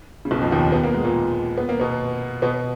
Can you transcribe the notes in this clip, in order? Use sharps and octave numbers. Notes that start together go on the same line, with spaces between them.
C#3
B1 B2
F2 F3
D#2 D#3
B3
A#3
G#3
A#2 A#3
B3
A#3
B2 B3
B2 B3